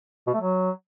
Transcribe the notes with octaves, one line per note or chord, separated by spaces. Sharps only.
B2
A3
F#3